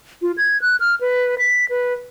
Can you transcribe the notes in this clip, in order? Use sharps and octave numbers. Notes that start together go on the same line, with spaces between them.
F4
G#6
F#6
F6
B4
B6
B4